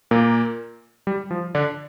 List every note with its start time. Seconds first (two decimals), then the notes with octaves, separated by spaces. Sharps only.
0.11 A#2 A#3
1.07 G3
1.31 F3
1.55 D3 D4